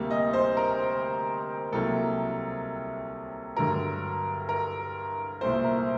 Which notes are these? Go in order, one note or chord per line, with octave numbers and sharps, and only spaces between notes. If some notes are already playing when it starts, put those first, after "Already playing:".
Already playing: D2 C3 G3 A#3
D#5
C5
A#4
C2 C3 F#3 A#3 A4
G2 D3 F#3 A#4
A#4
C2 A#2 A3 C5
A#4